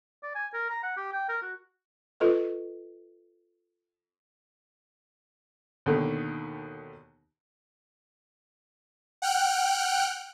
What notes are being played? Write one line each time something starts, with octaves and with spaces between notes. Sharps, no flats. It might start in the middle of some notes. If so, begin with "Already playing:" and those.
D5
G#5
A#4
A#5
F#5
G4
G5
A#4
F#4
F4 A4 B4 D#5
D#2 B2 D3 D#3
F#5 G5 F6 F#6 D7